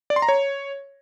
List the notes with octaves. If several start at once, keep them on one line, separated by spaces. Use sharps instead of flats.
D5
C6
A#5
C#5